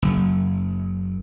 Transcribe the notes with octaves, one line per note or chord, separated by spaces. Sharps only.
F#1